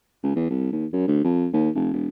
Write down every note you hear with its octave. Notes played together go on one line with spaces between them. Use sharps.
C#2
E2
C2
D#2
F#2
D2
F2
D#2
F1
E1